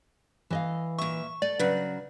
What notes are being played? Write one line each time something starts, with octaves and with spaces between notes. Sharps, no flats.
E3 D#5 F5
A#2 E5 C#6
A3 D5
C#3 F#3 B4